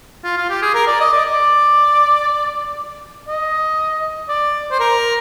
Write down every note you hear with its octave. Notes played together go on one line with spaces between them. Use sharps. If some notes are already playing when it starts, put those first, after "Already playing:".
F4
F4
G4
G#4
A#4
D5
D#5
D5
D5
D#5
D5
C5
A#4